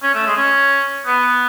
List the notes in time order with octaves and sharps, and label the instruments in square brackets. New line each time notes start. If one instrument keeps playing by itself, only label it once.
[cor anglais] C#4
A3
G#3
C#4
B3